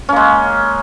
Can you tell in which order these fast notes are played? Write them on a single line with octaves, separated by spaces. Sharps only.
C#4 A#3 G#3